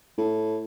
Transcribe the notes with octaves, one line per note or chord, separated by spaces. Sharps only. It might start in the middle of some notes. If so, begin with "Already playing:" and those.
A2